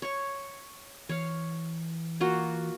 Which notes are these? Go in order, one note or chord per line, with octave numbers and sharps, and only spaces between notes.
C#5 C#6
E3 C#5 F5
A#3 F4 F#4